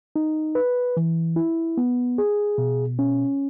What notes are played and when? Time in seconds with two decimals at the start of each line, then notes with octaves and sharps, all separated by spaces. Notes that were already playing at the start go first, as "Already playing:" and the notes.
0.16 D#4
0.55 B4
0.97 E3
1.36 E4
1.77 B3
2.18 G#4
2.58 B2
2.99 C#4